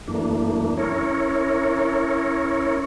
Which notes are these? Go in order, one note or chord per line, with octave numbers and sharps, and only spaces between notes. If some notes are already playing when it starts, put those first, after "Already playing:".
F#2 E3 A3 A#3 D4
C#4 E4 A#4 C#5